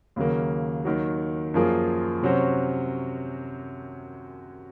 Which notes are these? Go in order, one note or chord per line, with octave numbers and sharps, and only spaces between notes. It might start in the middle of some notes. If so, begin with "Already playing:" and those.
D#2 C#3 F#3 A#3
D#2 D#3 F#3
F#2 F3 A#3 F4 G#4
C3 F#3 C#4 F#4 C5